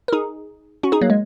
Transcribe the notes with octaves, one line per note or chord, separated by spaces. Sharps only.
A#4
D#4 G#4
C#4 F#4
D#4 G#4
F#3 A#3
G#3